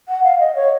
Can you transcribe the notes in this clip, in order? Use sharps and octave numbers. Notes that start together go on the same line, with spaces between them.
F#5
F5
D#5
C#5